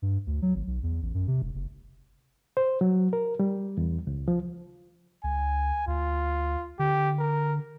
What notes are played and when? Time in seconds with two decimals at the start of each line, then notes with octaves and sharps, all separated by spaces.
0.02 G2
0.27 D2
0.42 F#3
0.55 G#1
0.67 B1
0.83 E2
1.02 A1
1.14 F#2
1.28 C3
1.42 E1
1.54 F#1
2.57 C5
2.81 F#3
3.13 A#4
3.39 G3
3.77 E2
4.07 C#2
4.28 F3
5.24 C#2 G#5
5.87 D2 F4
6.79 D3 G4
7.19 A#4